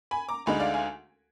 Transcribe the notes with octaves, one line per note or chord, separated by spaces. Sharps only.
G#5 B5
A#5 D6
D2 D3 G#3 D#4 G#5 B5
D5 F5
F5 G#5